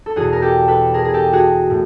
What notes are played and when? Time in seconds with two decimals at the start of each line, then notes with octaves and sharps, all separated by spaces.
0.06 A4
0.16 E2 B2 F#4 G#4
0.33 A#4
0.42 G4 A4
0.68 A4 B4
0.94 G#4 A#4
1.05 G#4
1.13 G4 A4
1.33 F#4 G#4
1.70 A2